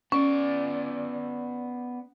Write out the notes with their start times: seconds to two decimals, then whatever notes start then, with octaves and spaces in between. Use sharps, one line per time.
0.12 B3 C#4 D5